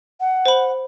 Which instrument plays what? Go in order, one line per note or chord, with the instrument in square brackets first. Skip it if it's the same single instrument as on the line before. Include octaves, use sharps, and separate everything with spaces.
[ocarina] F#5
[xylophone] C5 B5